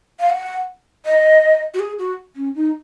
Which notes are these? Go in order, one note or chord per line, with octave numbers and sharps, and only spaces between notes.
F5
F#5
D#5
F#4
G#4
F#4
C#4
D#4